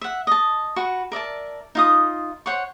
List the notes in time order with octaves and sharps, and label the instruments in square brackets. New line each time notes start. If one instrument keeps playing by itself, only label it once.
[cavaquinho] E5 F#5
D#5 A5
F#4 B4 C#6
A#4 D5 E5 A5
D#4 F4 D#6
C5 C#5 F#5 C#6